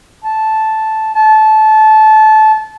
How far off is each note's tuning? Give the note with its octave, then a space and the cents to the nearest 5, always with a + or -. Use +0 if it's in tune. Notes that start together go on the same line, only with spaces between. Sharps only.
A5 -5
A5 -20